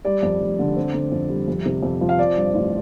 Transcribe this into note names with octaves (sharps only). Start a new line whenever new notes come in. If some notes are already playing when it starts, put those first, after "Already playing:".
G3 D5
F2
F1
D3
C4
D3
F2
G3
F2
C3
F2
F3
F5
C4 D5
G2
A1